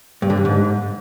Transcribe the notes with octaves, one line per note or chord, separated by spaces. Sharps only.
G2
D3
G2
G#2